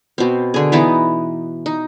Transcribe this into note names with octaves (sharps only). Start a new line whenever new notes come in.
B2 C4
D3 G#4
E3 B3 D#4
D#4